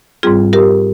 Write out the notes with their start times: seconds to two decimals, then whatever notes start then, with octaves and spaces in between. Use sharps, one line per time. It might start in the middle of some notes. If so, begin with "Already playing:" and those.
0.23 G#2 G3 C4 F4 G#4
0.53 G4 A#4